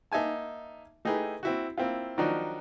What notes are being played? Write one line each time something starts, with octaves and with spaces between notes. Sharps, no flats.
A#3 D#4 E5 G#5 A5
A3 D#4 E4 G4 G#4 B4
C4 E4 F#4
A#3 C4 E4 F4
D#3 F3 F#3 D4 D#4 F#4